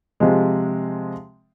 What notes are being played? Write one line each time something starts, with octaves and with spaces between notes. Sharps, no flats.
C3 F3 G#3